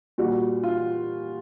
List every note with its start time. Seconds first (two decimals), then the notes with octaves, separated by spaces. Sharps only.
0.18 A#2 G3 F#4
0.64 F4